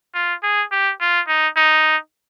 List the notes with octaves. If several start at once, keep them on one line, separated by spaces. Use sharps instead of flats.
F4
G#4
G4
F4
D#4
D#4